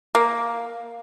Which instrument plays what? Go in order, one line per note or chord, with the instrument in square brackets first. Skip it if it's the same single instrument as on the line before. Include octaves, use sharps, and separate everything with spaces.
[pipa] A#3